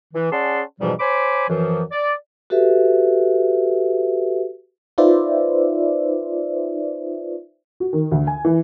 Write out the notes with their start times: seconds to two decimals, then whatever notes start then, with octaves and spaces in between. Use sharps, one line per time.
0.14 E3
0.32 C#4 G#4 D5 F#5 A5 C6
0.80 F2 G#2 B2 E3 F3 G3
1.00 C5 C#5 G#5 B5 D6
1.49 F#2 E3 F3
1.92 D5
2.50 F#4 G4 A4 B4 E5
4.98 D#4 F4 B4 C5 D5 E5
7.80 F#4
7.93 D#3
8.11 D2
8.27 G#5
8.45 E3